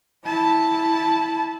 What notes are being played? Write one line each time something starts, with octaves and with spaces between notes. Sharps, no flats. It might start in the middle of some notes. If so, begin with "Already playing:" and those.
E4 A5